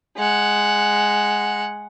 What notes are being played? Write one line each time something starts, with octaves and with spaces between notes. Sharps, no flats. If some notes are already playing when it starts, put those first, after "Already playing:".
G#3 F#5